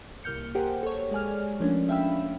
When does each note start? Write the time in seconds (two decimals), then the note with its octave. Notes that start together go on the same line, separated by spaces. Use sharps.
0.24 C2 A#3 F6 G6 C#7
0.55 G4 G#4 A#4 C5 F#5 G5
0.83 A4 C#5
1.11 G#3 D5 G#5 F6
1.60 F3 A3 A#3 C#4 D4
1.89 E5 F5 G5 B5 E6